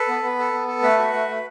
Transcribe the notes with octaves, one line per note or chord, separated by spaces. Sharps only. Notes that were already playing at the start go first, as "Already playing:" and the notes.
Already playing: A4 B4
B3
B3
A4
B3
A4
A3 B4
F#4
A3
A3